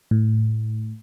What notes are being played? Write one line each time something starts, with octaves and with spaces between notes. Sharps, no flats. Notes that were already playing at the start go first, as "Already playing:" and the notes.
A2